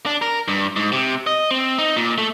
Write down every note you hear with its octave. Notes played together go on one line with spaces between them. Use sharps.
D4
A#4
G2
G#2
C3
D#5
C4
D#4
A#2
A3